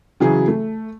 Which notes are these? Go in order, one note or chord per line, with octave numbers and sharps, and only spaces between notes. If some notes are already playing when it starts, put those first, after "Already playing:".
C#3 E3 F#3 G#4
A3